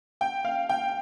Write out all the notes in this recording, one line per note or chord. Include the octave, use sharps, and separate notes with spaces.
G5
F5
G5